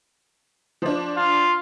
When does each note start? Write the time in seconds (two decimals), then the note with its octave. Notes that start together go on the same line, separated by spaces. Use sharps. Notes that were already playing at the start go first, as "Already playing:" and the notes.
0.82 F3 D4
1.17 F4